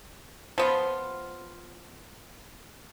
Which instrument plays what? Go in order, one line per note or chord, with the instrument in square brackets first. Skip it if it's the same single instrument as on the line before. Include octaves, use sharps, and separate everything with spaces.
[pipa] F3 B3 F4 [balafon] C5